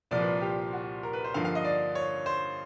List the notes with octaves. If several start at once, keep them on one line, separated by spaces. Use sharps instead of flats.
C2 A#2 F3 D5
B4
G4
F#4
A#4
B4
C5
G2 D3 F3 A#3 F5
F5
D#5
D5
C#5
C5